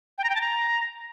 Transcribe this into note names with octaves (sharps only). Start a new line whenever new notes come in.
G5
A#5
G5
A5
A#5